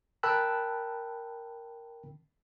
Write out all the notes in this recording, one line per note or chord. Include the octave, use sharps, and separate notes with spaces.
A#4 G5 A5 B5 E6 F#6